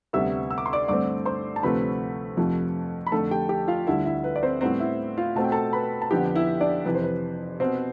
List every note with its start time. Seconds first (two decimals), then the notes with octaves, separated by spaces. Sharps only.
0.13 D2 C3 G3 B3 E5 E6
0.50 E6
0.58 D6
0.66 C6
0.73 D5 D6
0.88 G2 D3 A3 C4 D5 D6
1.25 C5 C6
1.56 A5
1.63 D2 C3 F3 A3 C4 B4 B5
2.37 F2 C3 F3 A3
3.07 B5
3.12 F2 D3 A3 A4 A5
3.31 G4 G5
3.49 G4 G5
3.68 F4 F5
3.87 D2 D3 G3 E4 E5
4.06 E4 E5
4.24 B4
4.36 D5
4.43 C4 C5
4.61 A2 G3 B3 C4 C5
4.80 E4 E5
5.18 F4 F5
5.36 B2 A3 C4 A5
5.44 G5
5.52 A4 A5
5.73 B4 B5
6.02 A5
6.11 F2 D3 F3 B3 G4 G5
6.36 E4 E5
6.60 D4 D5
6.86 F2 C3 E3 B4
6.95 C5
7.04 B4
7.60 B2 B3 C4 C5